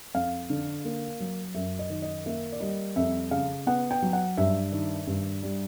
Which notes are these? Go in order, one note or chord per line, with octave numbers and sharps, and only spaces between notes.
F2 F5
D3
A#3
F#3
F#2 E5
D#5
D#3
D#5
A#3 E5
D5
G3 D#5
F2 E5
C#3 F5
B3 F#5
G5
F#3
F#5
G2 E5
D#3
G2
G3